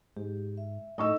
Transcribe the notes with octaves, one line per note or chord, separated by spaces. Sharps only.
G#2 G4
E5
A2 D#4 A4 D#5 C#6 E6